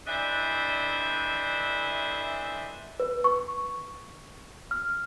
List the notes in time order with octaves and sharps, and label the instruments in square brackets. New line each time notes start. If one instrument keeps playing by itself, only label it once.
[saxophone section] D3 E3 D4 C5 D#5 E5
[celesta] B4
C#6
F6